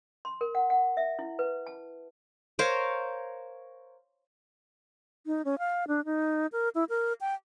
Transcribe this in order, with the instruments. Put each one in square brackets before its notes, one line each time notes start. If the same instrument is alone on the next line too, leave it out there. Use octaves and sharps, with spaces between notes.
[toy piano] C6
A#4
F#5
F#5
E5
E4
B4
A5
[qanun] A#4 C5 C#5 F5
[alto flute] D#4
C#4
F5
D4
D#4
A#4
E4
A#4
G5